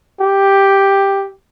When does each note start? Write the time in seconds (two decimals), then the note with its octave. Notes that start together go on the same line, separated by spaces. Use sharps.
0.21 G4